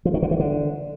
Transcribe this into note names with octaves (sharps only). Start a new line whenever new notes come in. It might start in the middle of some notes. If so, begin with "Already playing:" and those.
F3
D#3
D3
E3
D3